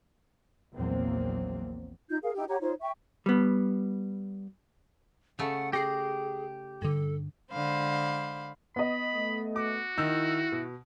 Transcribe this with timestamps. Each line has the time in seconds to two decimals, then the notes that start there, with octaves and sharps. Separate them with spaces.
0.74 A#1 E2 F#3 A#3 C4
2.09 D#4 F4 G6
2.22 G#4 A#4 F5
2.35 D#4 E4 G4 G5
2.48 G4 C#5 F#5 A#5
2.60 D#4 F4 C5 C#5
2.80 E5 G5 C#6
3.26 G3 B3
5.39 C#3 A3 F#5
5.73 G4 G#4 A#6 C7
6.82 G2 D3 A4
7.53 D3 G#3 C5 F5 B5
8.76 B3 D#5 B5
9.16 A3
9.56 F#4 D6
9.98 D#3 D#4 E4 E6
10.52 B2